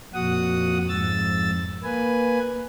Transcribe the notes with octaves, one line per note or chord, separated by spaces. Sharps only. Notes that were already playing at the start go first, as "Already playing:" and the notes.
F2 A#2 F#4 F#5 D#6
F2 G#2 E6 A6
A#3 B4 G#5